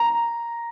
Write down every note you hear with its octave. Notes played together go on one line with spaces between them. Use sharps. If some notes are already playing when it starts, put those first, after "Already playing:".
Already playing: A#5